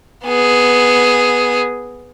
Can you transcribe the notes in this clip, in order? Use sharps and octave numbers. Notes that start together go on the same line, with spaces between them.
B3 G#4